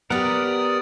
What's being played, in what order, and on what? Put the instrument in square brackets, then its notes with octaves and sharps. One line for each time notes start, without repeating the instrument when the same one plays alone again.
[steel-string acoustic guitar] B3 G4 [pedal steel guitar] A#4 F#5 [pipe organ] D5 D#6